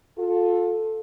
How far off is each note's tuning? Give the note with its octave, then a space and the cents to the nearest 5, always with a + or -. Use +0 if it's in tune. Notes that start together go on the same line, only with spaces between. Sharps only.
F4 +30 A4 +0